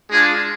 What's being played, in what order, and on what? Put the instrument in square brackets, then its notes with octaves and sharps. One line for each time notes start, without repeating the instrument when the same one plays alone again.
[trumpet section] G#3 D4 F4 G#4